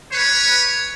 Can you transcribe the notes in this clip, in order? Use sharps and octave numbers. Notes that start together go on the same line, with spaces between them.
B4 C#5